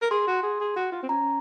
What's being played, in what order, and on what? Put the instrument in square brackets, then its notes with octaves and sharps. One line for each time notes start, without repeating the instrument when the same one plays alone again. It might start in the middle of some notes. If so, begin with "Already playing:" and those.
[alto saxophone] A#4
[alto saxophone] G#4 [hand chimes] C6
[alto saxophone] F#4
G#4
G#4
F#4
F4
C4
[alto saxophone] C#4 [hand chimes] A#5